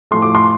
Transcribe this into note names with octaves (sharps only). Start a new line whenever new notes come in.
A2 F3 A3 C6
D6
C6